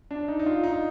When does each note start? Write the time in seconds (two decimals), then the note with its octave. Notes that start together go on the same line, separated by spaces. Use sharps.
0.11 D4
0.28 D#4
0.39 D#4
0.46 F4
0.63 D#4